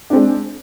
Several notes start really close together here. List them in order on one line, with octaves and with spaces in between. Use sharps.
D4 C4 G#3